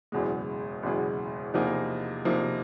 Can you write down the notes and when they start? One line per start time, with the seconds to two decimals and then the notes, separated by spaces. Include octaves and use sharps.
0.12 F#1 E2 B2 G#3
0.83 F#1 E2 B2 G#3
1.54 E2 C3 F3 A#3 D#4
2.25 E2 C3 F3 A#3 D#4